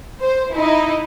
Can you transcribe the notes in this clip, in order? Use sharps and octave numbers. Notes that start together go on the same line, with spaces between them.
C5
D#4 E4